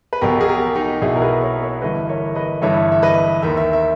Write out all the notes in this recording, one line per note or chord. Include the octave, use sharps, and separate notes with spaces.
B4
B1 B2 G4 A#4
G#4
G4 A#4
D#4 G4
B1 B2 E4 G#4
A#4
G#4 B4
A#4 C#5
C#5 E5
G1 G2 E3 B4 D#5
A#4 C#5
B4 D#5
G1 G2 E3 C#5 E5
E5
B4 D#5
D#2 D#3 E5
E5
E5